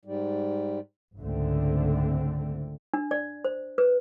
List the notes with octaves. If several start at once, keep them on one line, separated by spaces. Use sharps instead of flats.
G#2 G3
G#1 C#2 D3 A3 C4
D4
D5
C5
B4